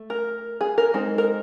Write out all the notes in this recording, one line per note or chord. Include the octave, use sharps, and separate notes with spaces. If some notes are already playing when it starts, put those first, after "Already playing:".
Already playing: A3
A#4
G#4
A#4
G#3 C4 D#4
A#4